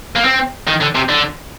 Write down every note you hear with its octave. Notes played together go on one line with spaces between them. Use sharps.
A#3
C4
D#3
D3
C3
D3